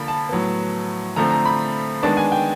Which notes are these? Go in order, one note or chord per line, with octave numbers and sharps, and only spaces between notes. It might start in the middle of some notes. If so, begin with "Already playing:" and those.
Already playing: D3 F3 A#3 B5
A5
A2 F#3 B3
D3 F3 A3 C4 A#5
A#5
B5
D#3 G#3 B3 D4 A5
G#5
G5